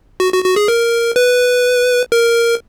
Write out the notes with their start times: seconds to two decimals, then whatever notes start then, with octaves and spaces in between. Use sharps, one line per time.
0.20 F#4
0.33 F#4
0.44 F#4
0.56 G#4
0.68 A#4
1.16 B4
2.12 A#4